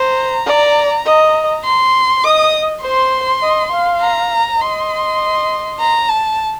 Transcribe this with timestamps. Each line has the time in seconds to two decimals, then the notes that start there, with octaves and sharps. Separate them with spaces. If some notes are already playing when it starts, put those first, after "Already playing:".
Already playing: C5 A#5
0.46 D5
1.05 D#5
1.64 C6
2.24 D#5 D#6
2.82 C5 C6
3.42 D#5
3.71 F5
4.01 A#5
4.60 D#5 C6
5.79 A#5
6.09 A5